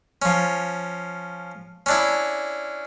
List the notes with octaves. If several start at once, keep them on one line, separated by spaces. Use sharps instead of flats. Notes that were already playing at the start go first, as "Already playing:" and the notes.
F3 C#4
C#4 D4 E4